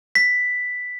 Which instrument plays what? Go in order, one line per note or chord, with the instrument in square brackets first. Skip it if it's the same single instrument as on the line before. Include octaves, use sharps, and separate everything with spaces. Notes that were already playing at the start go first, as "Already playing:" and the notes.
[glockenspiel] B6